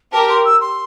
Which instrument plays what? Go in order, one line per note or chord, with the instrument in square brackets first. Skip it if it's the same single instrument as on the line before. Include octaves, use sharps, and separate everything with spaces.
[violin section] G4 A#4 [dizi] A5
[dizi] C6
E6
C6